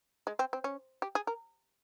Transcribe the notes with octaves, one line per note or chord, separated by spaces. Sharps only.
G#3
C4
C4
C#4
G4
G#4
A#4